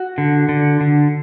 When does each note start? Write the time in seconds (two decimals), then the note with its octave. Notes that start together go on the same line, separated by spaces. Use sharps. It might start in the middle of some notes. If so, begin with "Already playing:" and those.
Already playing: F#4
0.18 D3
0.49 D3
0.81 D3